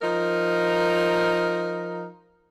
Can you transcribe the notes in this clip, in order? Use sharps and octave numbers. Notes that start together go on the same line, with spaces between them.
F3 D#4 A#4